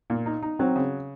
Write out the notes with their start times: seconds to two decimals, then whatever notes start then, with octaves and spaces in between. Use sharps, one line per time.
0.10 A#2
0.26 D#4
0.42 D#4
0.59 F#3 C4
0.76 C#3